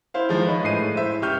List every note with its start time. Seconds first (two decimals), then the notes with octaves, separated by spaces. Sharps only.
0.14 E4 C5 F5
0.29 D#3 F3 G#3
0.46 B4 C#5 D#5
0.63 A2 G#3 C7 D#7
0.94 E4 C5 E5
1.22 C#2 G4 C#6 F6 G6